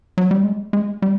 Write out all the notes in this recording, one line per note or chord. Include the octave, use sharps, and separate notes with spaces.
F#3
G3
G#3
G#3
G3